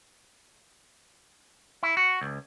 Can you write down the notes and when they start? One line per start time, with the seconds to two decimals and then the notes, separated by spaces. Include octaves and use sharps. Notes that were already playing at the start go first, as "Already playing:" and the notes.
1.83 E4
1.97 F#4
2.21 C#2